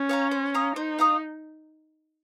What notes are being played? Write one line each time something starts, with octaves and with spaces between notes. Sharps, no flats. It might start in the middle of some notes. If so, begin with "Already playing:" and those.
Already playing: C#4
C#5 F5 A#5
C5
F5 A#5 D#6
D#4 C5
F5 A#5 D#6